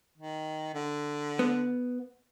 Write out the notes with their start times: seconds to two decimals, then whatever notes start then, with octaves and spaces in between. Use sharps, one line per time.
0.18 D#3
0.74 D3
1.39 B3